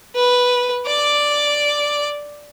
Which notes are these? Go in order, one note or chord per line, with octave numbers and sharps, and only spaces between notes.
B4
D5 D6